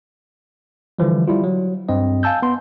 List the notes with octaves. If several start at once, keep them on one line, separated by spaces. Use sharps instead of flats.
D3 E3 F3 G3
G3 E4 F4
F#3
G2 C4 D#5
F5 G#5 A5 E6 G6
B3 C6